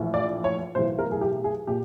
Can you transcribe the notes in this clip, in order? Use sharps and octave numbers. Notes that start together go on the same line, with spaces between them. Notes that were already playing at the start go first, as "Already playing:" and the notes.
Already playing: A#1 A2 E3
D5
C#5
B1 A2 E3 C5
A#4
G#4
G4
G#4
A#2 G4